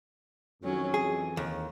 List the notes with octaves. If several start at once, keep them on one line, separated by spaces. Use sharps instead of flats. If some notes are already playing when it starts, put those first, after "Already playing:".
F2 D#3 F#3 C#4
E3 G#4
D#2